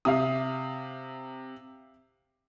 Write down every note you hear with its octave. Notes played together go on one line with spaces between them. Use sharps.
C3 G4 E5 F5 D#6